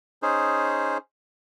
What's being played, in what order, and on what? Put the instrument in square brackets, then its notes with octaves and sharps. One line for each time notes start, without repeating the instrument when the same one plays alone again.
[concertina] C#4 D#4 G#4 C5